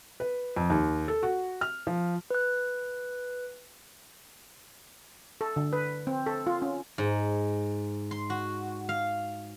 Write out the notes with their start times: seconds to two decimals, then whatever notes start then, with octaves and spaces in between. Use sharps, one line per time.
0.20 B4
0.56 F2
0.70 D#2
1.08 A4
1.23 F#4
1.61 F6
1.87 F3
2.30 B4 F#6
5.41 A4
5.56 D3
5.73 B4
6.07 C4
6.26 A4
6.47 F4
6.62 C#4
6.98 G#2
8.11 C6
8.30 F#4
8.89 F5